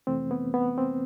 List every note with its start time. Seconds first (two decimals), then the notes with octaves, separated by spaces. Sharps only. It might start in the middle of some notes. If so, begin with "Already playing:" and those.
0.07 F2 C3 E3 A3 C4
0.31 B3
0.54 B3
0.78 C4